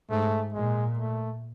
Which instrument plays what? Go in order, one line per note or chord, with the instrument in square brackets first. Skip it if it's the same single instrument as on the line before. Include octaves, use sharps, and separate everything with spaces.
[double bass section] G#2 [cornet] A3
[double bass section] A#2 [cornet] G#3
[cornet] A3